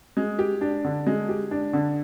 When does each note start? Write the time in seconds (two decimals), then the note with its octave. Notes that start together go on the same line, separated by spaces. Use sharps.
0.17 G#3
0.39 G4
0.61 D4
0.84 D3
1.07 G#3
1.29 G4
1.51 D4
1.73 D3